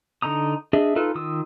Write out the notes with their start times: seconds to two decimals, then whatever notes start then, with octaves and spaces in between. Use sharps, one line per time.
0.22 D3 D#4 A#5 D#6
0.73 D4 G#4 D#5 E5
0.96 D#4 F4 A4 B4
1.15 D#3 F4 D#6 E6